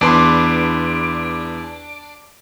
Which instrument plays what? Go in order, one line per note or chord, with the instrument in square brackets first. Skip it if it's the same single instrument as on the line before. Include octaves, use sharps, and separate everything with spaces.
[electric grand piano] E2 B4 C6 [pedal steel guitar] D4